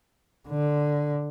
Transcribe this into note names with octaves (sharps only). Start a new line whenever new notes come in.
D3